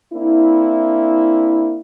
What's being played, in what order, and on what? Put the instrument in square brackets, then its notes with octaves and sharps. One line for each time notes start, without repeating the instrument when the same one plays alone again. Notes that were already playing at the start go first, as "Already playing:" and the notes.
[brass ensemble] A#3 C4 D4 E4